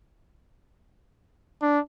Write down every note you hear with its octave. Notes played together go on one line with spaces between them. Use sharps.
D4